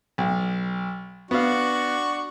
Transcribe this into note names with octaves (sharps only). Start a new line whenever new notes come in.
B1
B3 D4 F#4 F5 C#6